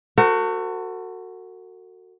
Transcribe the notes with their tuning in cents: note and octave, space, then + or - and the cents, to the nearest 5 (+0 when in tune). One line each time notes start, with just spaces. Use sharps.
F#4 +0 A4 +40 C5 -30